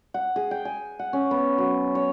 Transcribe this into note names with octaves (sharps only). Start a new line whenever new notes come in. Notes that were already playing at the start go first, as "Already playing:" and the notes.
F#5
G#4
G5
G#5
F#5
C#4
B3
F#3
C#5